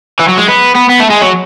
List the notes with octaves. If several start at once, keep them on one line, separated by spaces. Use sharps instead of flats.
E3
F#3
G#3
B3
B3
B3
A3
G#3
F#3